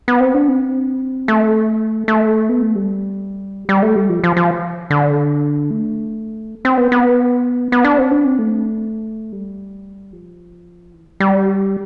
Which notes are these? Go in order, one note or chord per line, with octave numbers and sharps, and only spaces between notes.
B3
C4
D4
C4
A3
A3
B3
A3
G3
G3
A3
G3
F3
F3
F3
D3
A3
C4
B3
B3
B3
D4
C4
D4
C4
A3
G3
F3
E3
G3